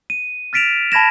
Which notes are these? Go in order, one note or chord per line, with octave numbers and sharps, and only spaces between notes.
D#7
F6 A6 B6 D7 E7 F7
A5 B5 G#6 A#6 E7